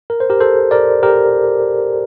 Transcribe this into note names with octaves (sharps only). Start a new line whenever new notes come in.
A#4
C5
G4 A#4
A4 C5
A#4 D5
G4 A#4